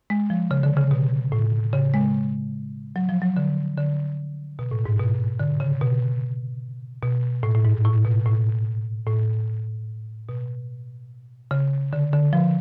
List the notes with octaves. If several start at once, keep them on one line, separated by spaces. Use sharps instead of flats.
G#3
F3
C#3
D3
C#3
B2
A2
C#3
G#3
F#3
F3
F#3
D3
D3
B2
A2
G#2
B2
D3
C#3
B2
B2
A2
A2
G#2
A2
B2
A2
A2
B2
C#3
D3
D3
F3